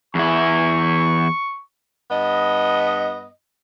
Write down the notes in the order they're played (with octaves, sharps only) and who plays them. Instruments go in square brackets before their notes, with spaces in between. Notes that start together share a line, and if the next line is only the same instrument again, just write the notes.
[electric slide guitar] E2 E4 [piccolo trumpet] C#6
[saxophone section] G2 B3 D#5